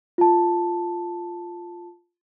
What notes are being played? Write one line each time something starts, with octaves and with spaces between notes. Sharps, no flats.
F4 A5